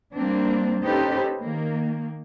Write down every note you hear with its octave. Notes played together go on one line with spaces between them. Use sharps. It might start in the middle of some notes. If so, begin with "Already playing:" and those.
G3 A#3 C4 D4
C#4 D#4 G4 A4 B4 C5
D#3 A#3